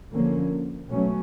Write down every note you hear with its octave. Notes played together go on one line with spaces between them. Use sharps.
D3 F3 A#3 C#4
B2 F#3 A3 C#4